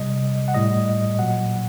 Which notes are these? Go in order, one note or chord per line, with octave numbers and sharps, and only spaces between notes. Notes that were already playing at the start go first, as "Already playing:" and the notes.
Already playing: C3 G3 D#5
F#5
A2 G3 D#5
A#2 F#3 F#5